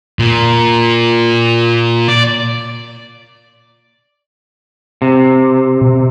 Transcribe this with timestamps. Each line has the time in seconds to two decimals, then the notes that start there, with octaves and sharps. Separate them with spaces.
0.19 A#2
2.08 D5
5.02 C3
5.81 B2